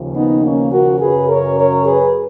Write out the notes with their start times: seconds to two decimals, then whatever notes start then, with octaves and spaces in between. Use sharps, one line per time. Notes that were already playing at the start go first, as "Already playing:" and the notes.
Already playing: D#2 C#3 F3
0.16 B3 D#4
0.43 A#3 C#4
0.72 F#4 A#4
1.01 F#2 C#3 F#3 G#4 B4
1.29 A#4 C#5
1.57 A#4 C#5
1.86 G#4 B4